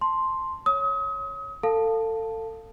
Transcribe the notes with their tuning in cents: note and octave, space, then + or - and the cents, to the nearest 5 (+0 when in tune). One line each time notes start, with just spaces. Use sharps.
A5 +0 C6 +5
C#5 +0 D#6 +35
A4 +25 F5 +0 A5 +0